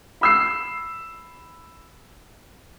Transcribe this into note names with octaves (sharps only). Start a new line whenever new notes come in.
B5 E6 C7